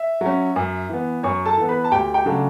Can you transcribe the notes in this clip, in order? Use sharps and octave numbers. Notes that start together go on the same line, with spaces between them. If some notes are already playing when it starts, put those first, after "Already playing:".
Already playing: E5
F#3 C#4
F#2
E3 B3
F#2 C#5 C#6
A4 A5
E3 B3
B4 B5
A5
D2 G4 G5
G4 G5
C#3 F#3 A3 D4